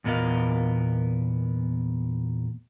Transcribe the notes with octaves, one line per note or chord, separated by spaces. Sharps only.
E2 A#2 B3 A#4 D#5 F5